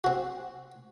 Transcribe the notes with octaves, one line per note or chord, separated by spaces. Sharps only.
C4 F#4